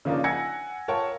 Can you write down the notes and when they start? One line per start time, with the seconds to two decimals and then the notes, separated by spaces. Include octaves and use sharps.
0.05 C#3 F3 A#3 D4 D#4 A#4
0.24 F#5 G#5 E6 G#6 A#6 C#7
0.88 F4 A#4 C#5 F#5 G5 A5